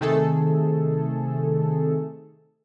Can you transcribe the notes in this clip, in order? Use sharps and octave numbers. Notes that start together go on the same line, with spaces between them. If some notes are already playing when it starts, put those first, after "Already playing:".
C3 D#3 A3 G#4 A4